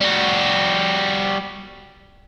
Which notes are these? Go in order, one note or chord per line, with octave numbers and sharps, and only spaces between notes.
G3 F#4